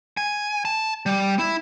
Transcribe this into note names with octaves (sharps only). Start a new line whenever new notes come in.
G#5
A5
G3
E4